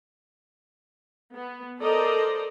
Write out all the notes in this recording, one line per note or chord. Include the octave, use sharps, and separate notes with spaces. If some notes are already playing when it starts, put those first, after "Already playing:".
B3
A4 A#4 C5 D5 D#5 A#5